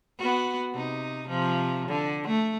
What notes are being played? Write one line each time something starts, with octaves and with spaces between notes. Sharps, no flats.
B3 F#4
C3 D#4
C3 F3
D3
A3